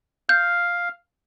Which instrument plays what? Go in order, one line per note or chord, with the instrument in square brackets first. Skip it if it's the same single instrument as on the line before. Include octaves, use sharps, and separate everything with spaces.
[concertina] F5 [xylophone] G6